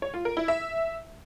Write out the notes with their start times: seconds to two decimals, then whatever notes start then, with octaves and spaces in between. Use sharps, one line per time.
0.02 C#5
0.14 F4
0.25 A#4
0.37 E4
0.48 E5